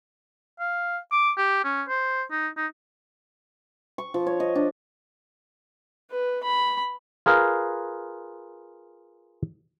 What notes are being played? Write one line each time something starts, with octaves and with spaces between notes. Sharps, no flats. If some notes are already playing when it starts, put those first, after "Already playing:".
F5
D6
G4
C#4
C5
D#4
D#4
C#6
F3
C#5
D#5
D4
B4
B5
F4 G#4 A#4 B4 F5